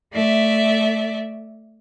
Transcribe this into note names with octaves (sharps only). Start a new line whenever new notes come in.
A3 D5 E5